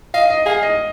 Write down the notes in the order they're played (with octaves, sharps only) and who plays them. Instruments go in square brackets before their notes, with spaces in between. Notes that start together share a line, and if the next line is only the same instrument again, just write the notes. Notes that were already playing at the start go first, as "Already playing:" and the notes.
[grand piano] D#5 [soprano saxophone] F5
[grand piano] D#5
[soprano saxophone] G#4 [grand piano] F5
[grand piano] D#5